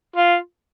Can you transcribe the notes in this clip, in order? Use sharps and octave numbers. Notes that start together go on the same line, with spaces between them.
F4